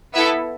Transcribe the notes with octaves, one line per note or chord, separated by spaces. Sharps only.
B3 E4 A4 E5